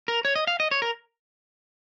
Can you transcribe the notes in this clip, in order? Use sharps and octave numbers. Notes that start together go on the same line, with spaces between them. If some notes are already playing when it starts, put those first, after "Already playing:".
A#4
C#5
D#5
F5
D#5
C#5
A#4